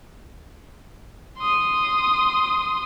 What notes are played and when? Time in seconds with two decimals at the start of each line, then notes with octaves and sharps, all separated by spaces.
1.38 C6 D#6